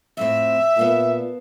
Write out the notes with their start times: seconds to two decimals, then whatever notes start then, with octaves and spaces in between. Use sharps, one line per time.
0.17 F2 A2 C4 E5
0.77 A#2 B3 F5 A5